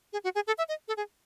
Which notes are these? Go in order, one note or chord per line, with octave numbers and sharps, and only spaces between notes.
G#4
F#4
G#4
A4
E5
D#5
A4
G#4